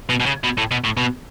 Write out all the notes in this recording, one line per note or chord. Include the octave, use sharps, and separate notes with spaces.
B2
B2
C#3
B2
A2
B2
A2
B2